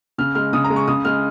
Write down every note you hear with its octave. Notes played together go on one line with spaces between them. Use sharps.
C#3 F6
G#3 F6
C#3 D#6
A#5
G#3
C#6
C#3 D#6
G#3 F6